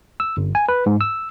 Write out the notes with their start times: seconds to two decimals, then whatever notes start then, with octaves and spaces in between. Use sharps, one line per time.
0.20 E6
0.37 G1
0.55 G#5
0.69 B4
0.86 G#2
1.01 E6